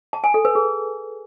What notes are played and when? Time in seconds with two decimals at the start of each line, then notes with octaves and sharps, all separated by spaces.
0.13 A5
0.24 G#5
0.34 A4
0.45 B4
0.55 G#4